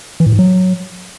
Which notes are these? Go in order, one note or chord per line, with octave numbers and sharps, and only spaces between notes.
E3
A2
G#2
F#3